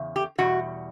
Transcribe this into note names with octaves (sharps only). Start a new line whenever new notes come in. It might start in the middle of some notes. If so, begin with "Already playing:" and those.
Already playing: E2 C#3
G4
E2 B2 G3 F#4